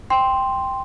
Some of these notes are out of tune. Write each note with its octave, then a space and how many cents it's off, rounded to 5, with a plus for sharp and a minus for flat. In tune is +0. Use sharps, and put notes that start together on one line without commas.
G5 +5 C6 +0